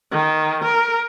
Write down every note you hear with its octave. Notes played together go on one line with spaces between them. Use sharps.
D#3
A#4